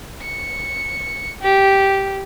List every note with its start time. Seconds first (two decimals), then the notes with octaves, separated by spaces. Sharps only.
0.22 C#7
1.42 G4